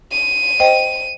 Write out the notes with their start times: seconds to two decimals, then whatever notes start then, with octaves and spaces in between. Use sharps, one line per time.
0.12 D#7
0.60 C5 D#5 G5